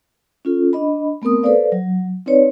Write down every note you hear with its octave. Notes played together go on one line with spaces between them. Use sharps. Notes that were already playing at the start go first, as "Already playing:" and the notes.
C#4 F4 A4
D4 D#5 B5
A3 B3 C4 A#4 D#6
A4 B4 C5 D5 F5
F#3
C4 D#4 B4 C#5 D5